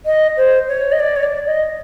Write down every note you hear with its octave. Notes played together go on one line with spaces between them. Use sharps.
D#5
C5
C#5
D#5
D5
C#5
D5
D#5